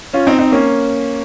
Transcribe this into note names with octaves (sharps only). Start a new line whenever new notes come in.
C#4 F4
C4 D#4
C4 D#4
A#3 C#4